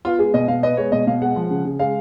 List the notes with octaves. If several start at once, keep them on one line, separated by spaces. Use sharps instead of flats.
B3 F4
G#3 G#4
B2 D#5
B2 F5
B3 D#5
G#3 C#5
B2 D#5
B2 F5
G#3 F#5
F3
C#3
C#3
G#3 F5